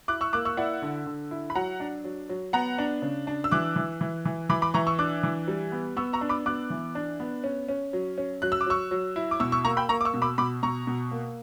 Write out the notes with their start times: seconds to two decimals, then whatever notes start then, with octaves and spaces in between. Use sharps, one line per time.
0.08 E4 D6 F#6
0.21 C#6 E6
0.33 A#3 D6 F#6
0.45 C#6 E6
0.57 E4 D5 F#5
0.82 D3
1.06 D3
1.31 E4
1.50 B5
1.55 F#3 F#5 A#5
1.80 D4
2.04 F#3
2.29 F#3
2.53 B3 F#5 A#5
2.78 D4
3.02 C#3
3.27 D4
3.44 E6
3.51 E3 D6 F#6
3.76 E3
4.01 E3
4.25 E3
4.49 E3 B5 D6
4.62 B5 D6
4.74 E3 A#5 C#6
4.87 C#6 E6
4.99 D4 D6 F#6
5.23 E3
5.48 G3
5.72 B3
5.97 B3 C#6 E6
6.13 A#5 C#6
6.21 D4
6.29 B5 D6
6.46 B3 D6 F#6
6.70 E3
6.95 D4
7.20 B3
7.44 C#4
7.68 C#4
7.93 F#3
8.18 C#4
8.42 F#3 F#6
8.52 E6
8.61 D6
8.66 F#3 C#6 E6
8.91 F#3
9.16 E4
9.31 D6
9.40 B2 C#6 E6
9.52 C#6 E6
9.65 A#3 A#5 C#6
9.77 G5 B5
9.89 A#3 A#5 C#6
10.01 D6
10.05 C#6 E6
10.14 B2
10.22 B5 D6
10.38 B2 B5 D6
10.63 B2 A#5 C#6
10.87 B2
11.11 A#3